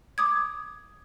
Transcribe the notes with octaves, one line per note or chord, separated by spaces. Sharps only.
D6 D#6 G#6